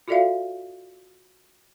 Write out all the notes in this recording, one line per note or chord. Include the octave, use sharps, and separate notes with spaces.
F4 F#4 A4 D5 E5 F5